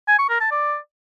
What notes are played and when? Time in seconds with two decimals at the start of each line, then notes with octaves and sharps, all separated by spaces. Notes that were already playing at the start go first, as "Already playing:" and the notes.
0.08 G#5
0.19 C#6
0.29 A#4
0.40 A5
0.51 D5